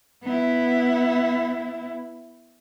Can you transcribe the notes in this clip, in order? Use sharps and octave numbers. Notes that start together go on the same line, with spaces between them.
B3 E4